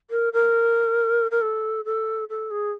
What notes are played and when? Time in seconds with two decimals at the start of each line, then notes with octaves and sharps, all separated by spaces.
0.10 A#4
0.33 A#4
1.31 A#4
1.42 A4
1.85 A4
2.30 A4
2.51 G#4